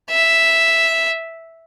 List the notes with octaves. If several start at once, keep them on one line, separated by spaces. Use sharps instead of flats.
E5